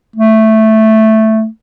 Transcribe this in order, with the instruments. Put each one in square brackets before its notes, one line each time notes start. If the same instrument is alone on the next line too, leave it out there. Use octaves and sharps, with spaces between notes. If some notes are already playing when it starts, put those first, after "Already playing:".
[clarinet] A3